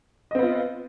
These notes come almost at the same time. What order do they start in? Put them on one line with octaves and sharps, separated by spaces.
D#5 C4 B3 F4